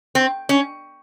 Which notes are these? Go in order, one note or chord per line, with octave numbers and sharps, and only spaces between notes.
C4
C#4